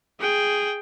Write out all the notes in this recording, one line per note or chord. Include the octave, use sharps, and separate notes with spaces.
G#4 G5